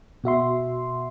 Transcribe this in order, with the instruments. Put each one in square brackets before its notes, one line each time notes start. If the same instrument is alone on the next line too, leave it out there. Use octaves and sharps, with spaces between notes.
[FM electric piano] B2 F#4 E5 C6